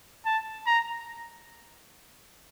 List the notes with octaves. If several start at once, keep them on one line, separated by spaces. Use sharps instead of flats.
A5
A#5